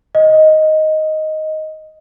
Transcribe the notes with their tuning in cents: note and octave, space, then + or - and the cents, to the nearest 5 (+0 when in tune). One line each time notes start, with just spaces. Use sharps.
D#5 +5